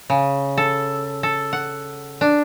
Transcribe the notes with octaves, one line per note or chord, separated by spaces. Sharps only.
C#3
A4
A4
F#5
D4